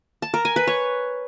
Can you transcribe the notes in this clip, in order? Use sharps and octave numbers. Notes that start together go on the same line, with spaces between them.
A5
A#4
G#5
B4
C#5